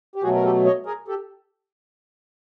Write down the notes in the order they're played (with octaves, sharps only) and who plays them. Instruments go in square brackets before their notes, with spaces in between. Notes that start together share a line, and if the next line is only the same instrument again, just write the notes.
[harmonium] G4
B2 F#3 A3 F#4 G#4
A#4
G4 A4
C#5 D#5
G#4 A#4
G4 A4